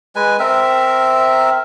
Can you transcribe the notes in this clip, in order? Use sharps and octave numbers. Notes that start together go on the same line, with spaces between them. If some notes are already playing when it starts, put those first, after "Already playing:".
G#3 B4 G#5
C4 A#4 E5